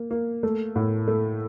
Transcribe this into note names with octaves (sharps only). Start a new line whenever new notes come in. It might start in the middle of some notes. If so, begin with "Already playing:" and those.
Already playing: A#3
A#3
A3
A2
A3